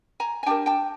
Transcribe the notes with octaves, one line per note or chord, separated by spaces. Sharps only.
G#5 A#5
G#5
D4 G4 A#4 G5 A5
G5 A5